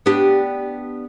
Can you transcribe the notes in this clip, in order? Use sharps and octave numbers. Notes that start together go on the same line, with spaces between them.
B3 D4 G4